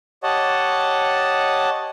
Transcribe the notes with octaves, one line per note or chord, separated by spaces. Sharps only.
G4 C#5 D#5 F#5 A5